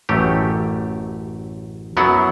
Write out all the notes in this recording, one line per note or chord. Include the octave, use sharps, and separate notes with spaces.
A1 F#2 A3 G4
F#2 F#3 B3 E4 F#5